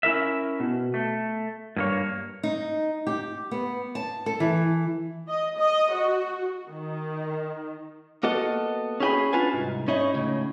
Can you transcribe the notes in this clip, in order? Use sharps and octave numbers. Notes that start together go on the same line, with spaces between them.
C#4 E4 A#4 E5
B2
A3
G2 A#3 C#5
D#4
G4
B3
A5
A4
E3
D#5
D#5
F#4
D#3
A#3 B3 F#4 A4 D#5
C#4 E4 G#4 G5 G#5 B5
C#4 D4 F4 F#4 B4 G#5
C2 G#2
C#4 D#4 E4 C#5 D#5
C#2 A2 C#3